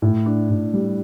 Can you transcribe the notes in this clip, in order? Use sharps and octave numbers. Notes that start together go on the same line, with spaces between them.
A2
D4
A2
G3